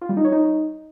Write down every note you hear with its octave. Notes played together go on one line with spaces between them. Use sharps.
F4
G3
D#4
C#5
D#4